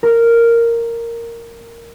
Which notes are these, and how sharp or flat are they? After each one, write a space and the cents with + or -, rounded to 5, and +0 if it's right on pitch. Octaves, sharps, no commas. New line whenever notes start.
A#4 -5